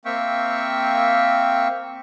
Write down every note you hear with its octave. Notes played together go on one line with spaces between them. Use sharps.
A#3 C4 E5 F5 G5 C#6